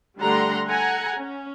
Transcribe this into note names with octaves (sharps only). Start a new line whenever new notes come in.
D3 G3 A3 F#5 A#5 C6
A4 F#5 G#5 A#5
C#4